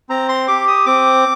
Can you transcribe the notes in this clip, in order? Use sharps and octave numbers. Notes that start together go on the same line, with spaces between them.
C4 A#5
C6
G4 D6
D#6
C4 D6